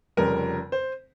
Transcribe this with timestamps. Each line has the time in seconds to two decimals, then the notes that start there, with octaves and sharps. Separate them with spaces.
0.17 F1 F2 C#3 G3 A#4
0.72 C5